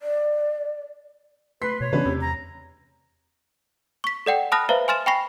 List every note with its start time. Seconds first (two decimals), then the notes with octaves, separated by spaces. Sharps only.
0.02 D5
1.62 B4 C6 B6 C7
1.81 B2 C#5
1.92 C#3 E3 B3 C#4 D4 B4
2.05 E2 C3
2.21 A#5
4.04 C#6 B6
4.26 A4 D5 F#5 G5
4.52 A5 B5 D#6 F6 F#6 A#6
4.69 B4 C5 E5 F5 A#5
4.88 G#5 C6 F6 A6 E7
5.06 G5 G#5 B5 C#6 A#6 C7